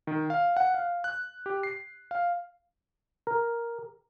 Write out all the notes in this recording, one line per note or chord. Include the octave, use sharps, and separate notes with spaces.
D#3
F5
F#5
F5
F#6
G4
C7
F5
A#4